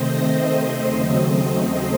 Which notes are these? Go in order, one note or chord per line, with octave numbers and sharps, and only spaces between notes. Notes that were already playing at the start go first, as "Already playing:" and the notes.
Already playing: C3 D#3 A3 C4 C5 D#5
D#2 C#3 F#3 A3 C4 C5 D#5